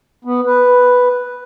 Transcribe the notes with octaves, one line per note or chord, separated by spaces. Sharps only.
B3
B4